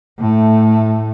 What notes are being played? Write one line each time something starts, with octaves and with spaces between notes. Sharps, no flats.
A2 A3